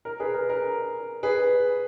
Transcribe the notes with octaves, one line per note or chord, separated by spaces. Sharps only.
A#4
G#4 B4
A#4
A#4
G#4 B4